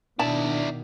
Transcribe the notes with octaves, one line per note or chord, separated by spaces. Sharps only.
B2 D#3 D4 E4 D5 A5